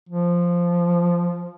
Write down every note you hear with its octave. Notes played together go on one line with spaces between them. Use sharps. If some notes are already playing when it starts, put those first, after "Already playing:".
F3